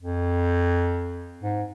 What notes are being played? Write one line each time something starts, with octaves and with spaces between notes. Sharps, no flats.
F2
G#2